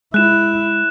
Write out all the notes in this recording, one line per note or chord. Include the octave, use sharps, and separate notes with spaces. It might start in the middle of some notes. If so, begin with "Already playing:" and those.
G#3 E4 F#6 E7